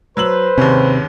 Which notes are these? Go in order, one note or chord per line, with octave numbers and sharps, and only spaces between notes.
F#3 B4 C5 E6 F#7
D#2 G#2 C3 C#4